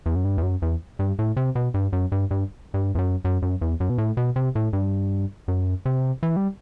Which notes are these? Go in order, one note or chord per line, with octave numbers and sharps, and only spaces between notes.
E2
F#2
G2
E2
F#2
E2
G2
A2
C3
B2
G2
F#2
G2
G2
G2
E2
F#2
F#2
F#2
E2
F#2
B2
A2
B2
C3
A2
G2
F#2
C3
E3
G3